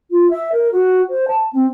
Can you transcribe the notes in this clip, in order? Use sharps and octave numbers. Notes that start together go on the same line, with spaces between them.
F4
E5
A#4
F#4
C5
A5
C4